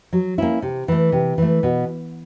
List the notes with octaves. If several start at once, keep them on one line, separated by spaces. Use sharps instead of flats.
F#3
A#3 C#4 E4
C3
E3 A3
C3
E3 A3
B2